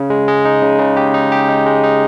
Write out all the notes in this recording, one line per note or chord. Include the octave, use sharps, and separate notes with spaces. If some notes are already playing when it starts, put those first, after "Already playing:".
Already playing: C#3
G#3
G#3
D#4
C#3
C#3
G4
D#4
G4
D#4
G#3
D#4